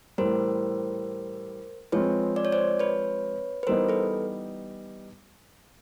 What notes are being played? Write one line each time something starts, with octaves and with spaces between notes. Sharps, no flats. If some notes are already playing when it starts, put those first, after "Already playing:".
A2 E3 G3 A#4 C5
F3 G#3 C4 B4 C#5
D5
C#5
C5 D5
B4 C#5
B4
E3 G3 B3 D#4 A#4 C5
A4 B4